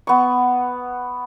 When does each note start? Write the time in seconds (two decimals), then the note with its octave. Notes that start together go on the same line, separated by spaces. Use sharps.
0.07 B3 C#6